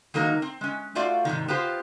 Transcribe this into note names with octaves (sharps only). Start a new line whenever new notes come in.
D#3 F#3 G#3 A#3 D#4 A#4
C4
G#3 C#4
A3 F4 F#4 D5 F5
G#2 C3 D#3
B3 F4 G4 C5